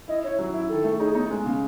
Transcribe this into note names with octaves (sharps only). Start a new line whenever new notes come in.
E4 D#5
E4 C#5
F#3
E4
D#3 A4
A3
D#4 G#4
B3 D#4
G#3
C#3